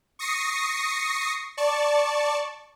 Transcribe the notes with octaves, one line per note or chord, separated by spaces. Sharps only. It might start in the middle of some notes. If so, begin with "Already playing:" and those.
C#6 D#6 A#6 C7 C#7
D5 A5 C#6